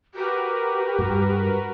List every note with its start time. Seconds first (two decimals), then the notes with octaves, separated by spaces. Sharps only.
0.14 F#4 G4 A#4 B4
0.99 G2